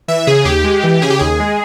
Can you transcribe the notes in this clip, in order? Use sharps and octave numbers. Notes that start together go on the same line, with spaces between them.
E3 E5
C#3 G#4
D#2 G4
G#3
E3
C#3 G#4
G4
D#2 G#4
G#3